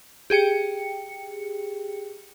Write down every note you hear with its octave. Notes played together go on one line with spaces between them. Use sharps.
G4 G#4 G5 C#7